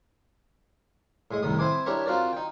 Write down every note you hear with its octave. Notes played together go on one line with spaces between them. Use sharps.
A2 G#3 D#5
C2 A2 D#3 D#6
C4 E4 C5 G#5 D6
D4 E4 G4 A#4 C#5
C4 F4 F#4 A#4 D5
D#4 G5